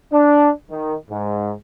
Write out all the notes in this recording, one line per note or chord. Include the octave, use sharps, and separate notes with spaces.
D4
D#3
G#2